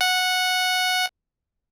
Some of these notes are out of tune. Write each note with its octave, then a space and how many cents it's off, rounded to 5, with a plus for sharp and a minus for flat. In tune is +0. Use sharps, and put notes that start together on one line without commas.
F#5 -10